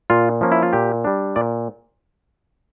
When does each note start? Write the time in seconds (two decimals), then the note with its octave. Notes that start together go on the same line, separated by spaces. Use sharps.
0.10 A#2 F4
0.41 F3 A#3 C#4
0.52 E4
0.63 F4
0.73 A#2 G4
1.04 G3 D4
1.36 A#2 D5